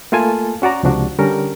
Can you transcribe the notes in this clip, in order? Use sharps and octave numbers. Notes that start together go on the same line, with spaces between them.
A3 A#3 F4 A4 G#5 A5
C#4 F#4 D5 A#5
C#2 C3 F3 D4 F#4
D3 G3 C#4 D4 A#4